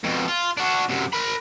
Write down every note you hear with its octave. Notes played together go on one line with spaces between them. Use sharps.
F2 B2
F4
D4 F#4
F#2 C3
A#4 B5